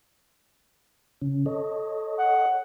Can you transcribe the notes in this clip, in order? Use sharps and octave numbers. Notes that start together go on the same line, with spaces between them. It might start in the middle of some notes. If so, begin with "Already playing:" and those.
C#3 C#4
A4 C#5 D#5
F#5